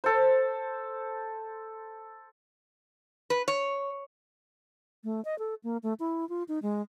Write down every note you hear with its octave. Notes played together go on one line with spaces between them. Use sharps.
A4 C5
B4
C#5
A3
D#5
A4
A#3
A3
E4
F4
D#4
G#3